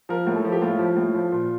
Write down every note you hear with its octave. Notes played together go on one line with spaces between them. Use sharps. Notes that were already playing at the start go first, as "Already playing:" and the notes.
F3 A#4
A2
A4
F3
G4
A2 F4
F3
A2
F3
A#2